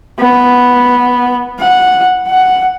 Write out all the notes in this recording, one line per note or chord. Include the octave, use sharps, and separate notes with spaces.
B3
F#5
F#5